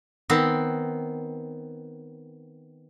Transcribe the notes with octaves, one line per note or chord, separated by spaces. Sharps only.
D#3 B3 C4